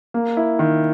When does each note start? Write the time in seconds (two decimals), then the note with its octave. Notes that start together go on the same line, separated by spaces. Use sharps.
0.14 A#3
0.37 E4
0.59 D#3